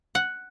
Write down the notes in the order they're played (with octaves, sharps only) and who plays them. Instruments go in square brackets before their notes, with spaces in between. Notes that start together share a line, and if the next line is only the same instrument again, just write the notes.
[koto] F#5